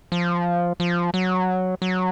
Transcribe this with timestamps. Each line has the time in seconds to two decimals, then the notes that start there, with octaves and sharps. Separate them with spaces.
0.12 F3
0.80 F3
1.14 F#3
1.82 F#3